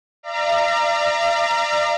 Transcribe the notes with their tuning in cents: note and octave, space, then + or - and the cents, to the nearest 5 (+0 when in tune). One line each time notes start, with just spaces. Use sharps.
D5 +30 F5 -45 A#5 +0